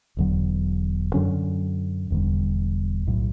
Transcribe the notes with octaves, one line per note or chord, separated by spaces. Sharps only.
E1 E2 D3 F#3
F#2 D3 F#3 C#4
E1 E2 D3 G3
B1 A2 F#3